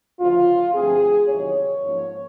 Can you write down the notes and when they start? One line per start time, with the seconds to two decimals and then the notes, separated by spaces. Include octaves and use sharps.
0.20 D2 C#3 F3 F4
0.75 G2 D3 F3 A3 C4 G#4
1.29 E2 C3 D#3 F#3 C#5
1.84 G#2 F3 A#3 C#4